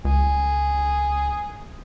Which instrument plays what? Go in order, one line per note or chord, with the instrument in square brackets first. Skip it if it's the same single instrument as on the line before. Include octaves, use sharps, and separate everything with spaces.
[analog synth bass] C#2 [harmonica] G#4